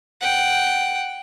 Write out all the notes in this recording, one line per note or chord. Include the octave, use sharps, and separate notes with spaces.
F#5 G5